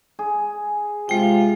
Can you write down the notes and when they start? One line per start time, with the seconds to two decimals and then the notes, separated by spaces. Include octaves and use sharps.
0.19 G#4
1.09 C3 G#3 F4 G5